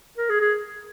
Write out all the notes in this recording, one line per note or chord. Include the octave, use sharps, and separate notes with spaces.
A#4
G#4
G#4